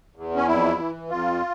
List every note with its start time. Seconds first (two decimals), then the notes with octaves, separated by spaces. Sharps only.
0.16 E2
0.36 C#4
0.48 F2 E4
0.79 E3
1.10 F2 F4